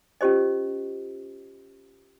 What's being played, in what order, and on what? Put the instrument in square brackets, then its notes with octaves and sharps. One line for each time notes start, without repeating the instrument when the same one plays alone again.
[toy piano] C#4 F4 G4 C5 D#5